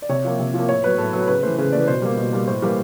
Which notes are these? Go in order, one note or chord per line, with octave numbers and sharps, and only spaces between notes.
D5
C3 C#5
F3 A#3
C3
F3
A#3
A2 C#5
F#3 B3 B4
A2 A4
F#3 B3
C#3 B4
E3 A3 C5
C#3 C5
E3 A3 D5
B2 C5
G3 A#3
B2
G3 A#3
A2 C5
E3 G3 A#3